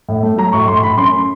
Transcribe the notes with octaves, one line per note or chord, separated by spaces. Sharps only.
A2
A3
F#3 A#5
A2 C#6
A2 C6
A2 B5
F#2 C6